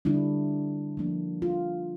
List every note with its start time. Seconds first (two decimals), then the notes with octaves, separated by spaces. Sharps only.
0.05 D3 G3 D4 E4
0.97 F3 A#3 D4
1.42 F4